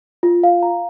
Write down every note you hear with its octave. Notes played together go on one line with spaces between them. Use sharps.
F4
F5
A#5